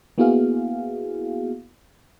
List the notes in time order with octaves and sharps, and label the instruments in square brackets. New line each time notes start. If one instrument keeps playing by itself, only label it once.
[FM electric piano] A#3 B3 E4 F#4 G#4 F5